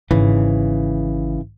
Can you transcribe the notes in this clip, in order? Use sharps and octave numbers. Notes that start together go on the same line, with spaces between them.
G#1 C#3 E3